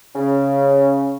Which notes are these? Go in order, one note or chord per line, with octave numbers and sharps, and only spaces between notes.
C#3